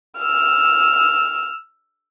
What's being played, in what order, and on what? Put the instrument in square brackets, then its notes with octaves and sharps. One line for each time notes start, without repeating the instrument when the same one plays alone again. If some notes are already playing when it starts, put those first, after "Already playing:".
[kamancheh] E6 F6